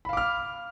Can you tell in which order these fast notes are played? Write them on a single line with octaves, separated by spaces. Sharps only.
B5 F5 D6 F6